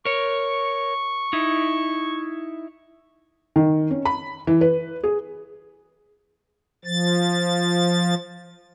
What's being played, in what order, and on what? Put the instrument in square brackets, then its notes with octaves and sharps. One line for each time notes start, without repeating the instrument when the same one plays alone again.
[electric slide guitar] A#4 C#5 [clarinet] C#6
[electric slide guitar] D#4 E4
[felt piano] D#3
C#4
B5
E3
B4
G#4
[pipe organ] F3 A6